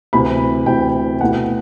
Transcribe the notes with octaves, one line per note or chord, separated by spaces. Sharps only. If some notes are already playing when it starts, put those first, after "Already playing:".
D2 C3 E3 B5
D2 C3 E3 G5
B2 A3 E4 F#5